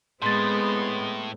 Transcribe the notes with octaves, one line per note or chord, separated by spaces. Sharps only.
A2 G#3 B3 C4 C6 A6